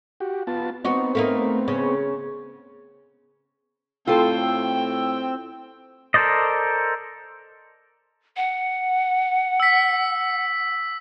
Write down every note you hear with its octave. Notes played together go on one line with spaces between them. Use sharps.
F#4 G4
B3 F4 A5
B3 C4 D#4 F#4
A3 A#3 D#4
C#3
A2 C4 F4 A4 C5 G5 E6
A4 A#4 C5 D5 D#5
F#5
E6 B6